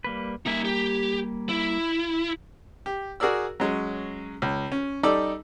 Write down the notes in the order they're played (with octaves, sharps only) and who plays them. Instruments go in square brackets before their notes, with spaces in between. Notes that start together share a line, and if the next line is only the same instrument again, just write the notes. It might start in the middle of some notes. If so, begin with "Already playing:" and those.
[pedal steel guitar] G3 A#3 B4
[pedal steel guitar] G3 A#3 G#5 [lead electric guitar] D#4 E5
[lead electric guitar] G4
E4
[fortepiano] G4
F#4 G#4 A#4 D5 E6
F#3 G#3 C#4
C#2
C#4
G3 D#4 A4 D5 D6 E6